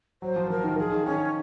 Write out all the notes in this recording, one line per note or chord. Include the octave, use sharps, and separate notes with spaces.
F#3 C5
F3
F3 A#4
D#3
F3 G#4
D#3
D#3 C#4